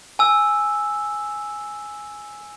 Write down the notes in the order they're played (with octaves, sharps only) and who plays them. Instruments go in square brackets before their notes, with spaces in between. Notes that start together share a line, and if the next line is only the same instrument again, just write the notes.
[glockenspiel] G#5 E6